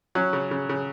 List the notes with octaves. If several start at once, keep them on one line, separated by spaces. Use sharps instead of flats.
F#3 C#4
C#3
C#3
C#3